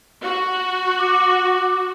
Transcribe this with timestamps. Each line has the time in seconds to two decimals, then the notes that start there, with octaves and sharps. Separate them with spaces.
0.22 F#4
0.99 D6